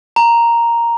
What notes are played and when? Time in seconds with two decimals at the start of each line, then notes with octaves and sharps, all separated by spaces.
0.16 A#5